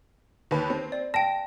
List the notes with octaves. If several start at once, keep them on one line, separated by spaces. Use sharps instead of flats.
D#2 B4
C4
D5
G5 A5 A#6